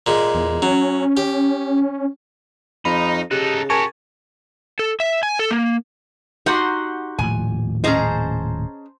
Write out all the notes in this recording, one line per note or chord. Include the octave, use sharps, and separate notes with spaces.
A#2 G#3
E2
F#3 C#4
G4
F2 D#4 B5
C#3 D#4 G4 A4 F#6
F#4 G4 A#4 G#5 A5 C#6
A4
E5
G#5
A4
A#3
D#4 F#4 G4 F#5 C6
D#1 A2 F3 G#5
C#4 G#4 C5 D#5 A5 A#5